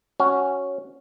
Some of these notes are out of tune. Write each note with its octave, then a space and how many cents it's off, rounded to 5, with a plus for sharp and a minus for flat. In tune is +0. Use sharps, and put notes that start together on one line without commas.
C#4 +0 F#4 +0